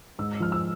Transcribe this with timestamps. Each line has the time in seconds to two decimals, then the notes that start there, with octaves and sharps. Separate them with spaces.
0.19 G#2 E6
0.40 F3 F6
0.52 E6